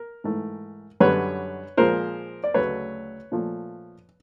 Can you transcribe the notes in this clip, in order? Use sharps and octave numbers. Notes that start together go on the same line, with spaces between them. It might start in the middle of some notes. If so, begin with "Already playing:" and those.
Already playing: A#4
G#2 E3 A3
F#2 D3 G3 B4 C#5
A#2 F3 G#3 A#4 C5
D5
D2 C#3 F#3 A3 B4 C#5
A#2 F3 A3